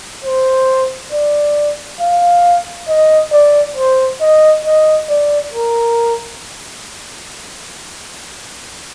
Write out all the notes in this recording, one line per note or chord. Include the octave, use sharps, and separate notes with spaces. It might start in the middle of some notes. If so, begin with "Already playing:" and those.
C5
D5
F5
D#5
D5
C5
D#5
D#5
D5
A#4